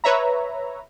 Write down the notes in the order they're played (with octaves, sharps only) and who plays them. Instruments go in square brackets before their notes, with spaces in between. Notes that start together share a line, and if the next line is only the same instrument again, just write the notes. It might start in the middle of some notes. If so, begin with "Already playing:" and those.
[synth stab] B4 C#5 E5 A#5